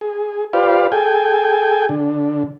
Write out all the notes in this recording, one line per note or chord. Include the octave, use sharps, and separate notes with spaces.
G#4
F4 G4 B4 C5 D5 F5
G#4 A4 G5 G#5
D3